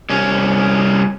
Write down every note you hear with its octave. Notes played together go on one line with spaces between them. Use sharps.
C2 C#4